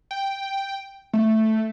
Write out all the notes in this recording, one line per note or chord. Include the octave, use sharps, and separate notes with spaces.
G5
A3